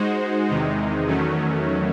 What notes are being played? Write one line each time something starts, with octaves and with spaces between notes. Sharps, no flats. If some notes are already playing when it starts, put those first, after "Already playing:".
Already playing: G#3 D#4 F#4 C5
E2 C3 D#3 G#3 D#4
E2 D#3 F#3 A3 C#4